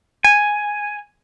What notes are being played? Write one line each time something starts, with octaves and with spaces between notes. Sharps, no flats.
G#5